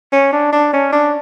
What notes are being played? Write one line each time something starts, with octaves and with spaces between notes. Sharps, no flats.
C#4
D4
D4
C#4
D4